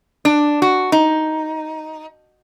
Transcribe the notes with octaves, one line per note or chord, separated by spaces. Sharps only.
D4
F#4
D#4